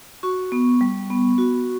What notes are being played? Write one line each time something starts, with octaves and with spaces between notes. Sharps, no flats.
F#4 C#6
B3
G3
B3
F#4